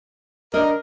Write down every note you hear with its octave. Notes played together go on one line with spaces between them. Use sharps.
D4 A#4 D#5